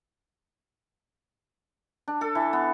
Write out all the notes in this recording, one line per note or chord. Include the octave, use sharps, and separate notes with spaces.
D4
A4
E3
B3